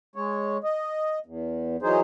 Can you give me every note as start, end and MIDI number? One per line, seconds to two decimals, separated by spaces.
0.16 0.57 56
0.16 0.57 73
0.64 1.19 75
1.26 1.76 40
1.82 2.00 52
1.82 2.00 54
1.82 2.00 63
1.82 2.00 68
1.82 2.00 72